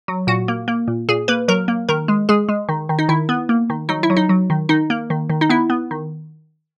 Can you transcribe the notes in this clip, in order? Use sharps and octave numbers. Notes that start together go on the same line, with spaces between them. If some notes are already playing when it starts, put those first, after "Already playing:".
F#3
A#2 F#4
A#3
A#3
A#2
A#2 G#4
A#3 B4
F#3 A#4
A#3
D#3 A#4
G#3
G#3 G#4
G#3
D#3
D#3
D#4
D#3 E4
B3
A#3
D#3
F#3 D#4
E4
F#3
D#4
F#3
D#3
D#3 D#4
A#3
D#3
D#3
D#4
B3 E4
B3
D#3